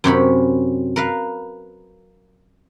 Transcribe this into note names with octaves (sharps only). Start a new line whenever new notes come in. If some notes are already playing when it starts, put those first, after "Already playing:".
F#2 C3 C#4 B5
A#4 B4 F5